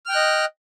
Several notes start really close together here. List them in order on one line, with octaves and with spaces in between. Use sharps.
F6 G5 F#6 D#5